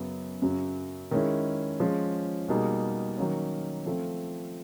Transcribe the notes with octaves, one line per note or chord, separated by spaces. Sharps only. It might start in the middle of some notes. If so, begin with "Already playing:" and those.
Already playing: F#2 C#3 F#3 B3
F#2 C#3 F#3
D#3 G#3 C#4 E4
F3 G#3 C#4
B2 G3 A#3 D#4 G#4
D#3 F#3 A#3 C#4
F3 A3 C4